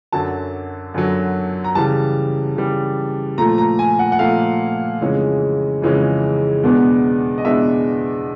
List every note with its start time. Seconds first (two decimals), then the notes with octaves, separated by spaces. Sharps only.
0.12 F#2 D3 F#3 A5
0.94 F#2 D3 F#3
1.64 A#5
1.75 C#3 E3 G3 A5
2.56 C#3 E3 G3
3.38 A#2 F3 A3 A#5
3.58 A#5
3.79 G#5
3.99 F#5
4.12 F#5
4.19 A#2 F3 A3 F5
5.01 F2 C#3 E3 G#3 C#4
5.82 F2 C#3 E3 G#3 C#4
6.64 E2 B2 G#3 B3 D4
7.38 D#5
7.45 E2 B2 G#3 B3 D4 E5